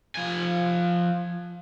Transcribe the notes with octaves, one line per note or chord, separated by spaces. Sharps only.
F3 G#5